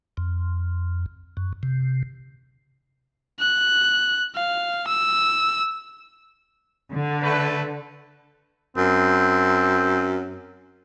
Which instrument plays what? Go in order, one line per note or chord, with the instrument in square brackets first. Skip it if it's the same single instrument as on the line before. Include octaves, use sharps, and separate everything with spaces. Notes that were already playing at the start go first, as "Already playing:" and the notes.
[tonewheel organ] F2
F#2
C3
[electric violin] F#6
F5
E6
[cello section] D3
[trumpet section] A3 B4
[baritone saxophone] F#2 [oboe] C4